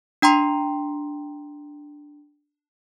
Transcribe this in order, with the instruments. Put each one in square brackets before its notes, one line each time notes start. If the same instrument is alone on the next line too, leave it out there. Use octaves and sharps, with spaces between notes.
[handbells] D4 G5 A#5 C6